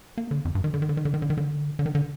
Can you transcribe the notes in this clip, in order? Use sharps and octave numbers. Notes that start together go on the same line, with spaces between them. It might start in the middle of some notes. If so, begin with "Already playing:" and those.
A#3
D3
F2
G2
D#3
D3
D#3
D3
D#3
D3
D#3
D3
D#3
D3
D3
D#3
D3